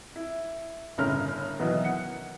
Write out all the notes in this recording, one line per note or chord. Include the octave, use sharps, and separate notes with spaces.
E4
G1 A2 C#3 C#4 A#4 F6
B2 D#3 E3 F#3 B3 A#4
F#5 C#7